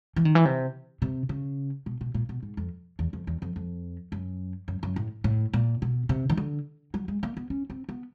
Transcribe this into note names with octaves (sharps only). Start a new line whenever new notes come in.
E3
D#3
E3
C3
C3
C#3
B2
B2
A#2
B2
G#2
F2
E2
F2
E2
F2
F2
F#2
F#2
F#2
A2
A2
A#2
B2
C3
D#3
D3
F#3
G#3
A#3
B3
C#4
C4
B3